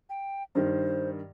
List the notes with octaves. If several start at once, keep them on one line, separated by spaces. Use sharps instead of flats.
G5
G2 D#3 C5